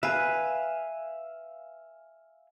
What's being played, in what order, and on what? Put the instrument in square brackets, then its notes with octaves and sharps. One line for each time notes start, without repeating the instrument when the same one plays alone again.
[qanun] B4 [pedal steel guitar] E5 F5 G#5